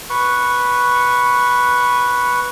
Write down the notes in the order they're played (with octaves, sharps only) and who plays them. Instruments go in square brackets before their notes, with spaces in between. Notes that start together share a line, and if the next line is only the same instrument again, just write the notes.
[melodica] B4 C#6